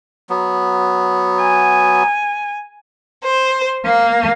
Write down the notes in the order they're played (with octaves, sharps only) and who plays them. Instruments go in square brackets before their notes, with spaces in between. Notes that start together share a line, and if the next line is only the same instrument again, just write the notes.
[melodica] F#3 B3
[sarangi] G#5
[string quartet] C5
A#3